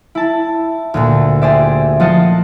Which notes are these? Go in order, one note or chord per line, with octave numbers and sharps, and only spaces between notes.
E4 A5
D2 A#2 D3
G4 G#4 C5 D5 E5
F3 F4 D#5 F#5 A5